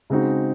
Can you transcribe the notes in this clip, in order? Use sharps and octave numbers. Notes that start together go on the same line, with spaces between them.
C#3 G#3 C4 D#4 F#4